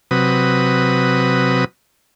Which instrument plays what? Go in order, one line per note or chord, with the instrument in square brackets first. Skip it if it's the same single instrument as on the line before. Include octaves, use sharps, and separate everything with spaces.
[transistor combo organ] C3 F#3 B4 D#6